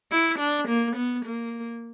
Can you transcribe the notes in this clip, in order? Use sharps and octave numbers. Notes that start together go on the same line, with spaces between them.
E4
D4
A#3
B3
A#3